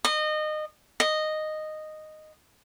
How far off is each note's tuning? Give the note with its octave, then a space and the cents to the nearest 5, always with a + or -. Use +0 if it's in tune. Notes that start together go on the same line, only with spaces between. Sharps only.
D#5 -25
D#5 -10